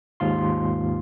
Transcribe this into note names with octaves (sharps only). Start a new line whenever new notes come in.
D#2 G#2 F4 C6